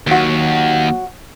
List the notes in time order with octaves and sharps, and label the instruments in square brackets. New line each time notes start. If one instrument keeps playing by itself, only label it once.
[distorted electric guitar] D#2 [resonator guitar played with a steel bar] F#3 F#4